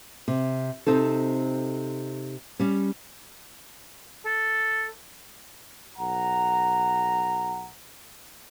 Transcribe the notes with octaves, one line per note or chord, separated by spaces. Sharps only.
C3
C3 C4 D#4 A4
G3 C#4
A4
B1 F#5 A#5